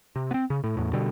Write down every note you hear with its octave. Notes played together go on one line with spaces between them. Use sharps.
C3
B3 C4
C#3
A2
E2 A2
B2 D3 G3